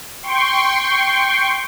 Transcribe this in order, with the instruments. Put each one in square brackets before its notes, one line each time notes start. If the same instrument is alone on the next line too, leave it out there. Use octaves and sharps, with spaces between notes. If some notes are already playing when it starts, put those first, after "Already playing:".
[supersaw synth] G5 C6 C#6